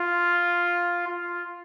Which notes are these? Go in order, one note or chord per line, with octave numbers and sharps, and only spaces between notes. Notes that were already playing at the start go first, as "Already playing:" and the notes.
Already playing: F4
F4